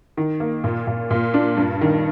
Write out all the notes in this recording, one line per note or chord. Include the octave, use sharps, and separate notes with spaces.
D#3
A#3
A#2
A#2
A#2
D4
G2
D#3